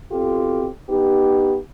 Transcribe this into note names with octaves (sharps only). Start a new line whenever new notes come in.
B2 C4 F4 G4 A4
B3 D#4 G4